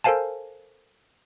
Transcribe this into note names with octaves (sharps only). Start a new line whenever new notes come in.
A4 A#4 C5 F5 G#5 A5